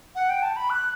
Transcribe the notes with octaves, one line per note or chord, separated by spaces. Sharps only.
F#5
G5
A5
B5
F#6